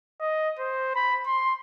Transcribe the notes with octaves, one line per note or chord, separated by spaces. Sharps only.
D#5
C5
B5
C6